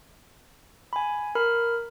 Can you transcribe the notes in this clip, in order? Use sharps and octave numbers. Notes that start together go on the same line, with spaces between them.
G#5 B5
A#4 B5 F6